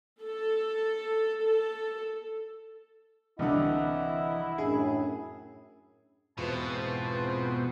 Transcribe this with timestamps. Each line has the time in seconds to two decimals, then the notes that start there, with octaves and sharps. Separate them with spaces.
0.23 A4
1.42 A4
3.39 C2 D3 E3 E4 D#5 E5 F#5
4.58 F#2 A2 D4 G#4
6.37 E2 G#2 B2 C4 F4 B4 C5 A5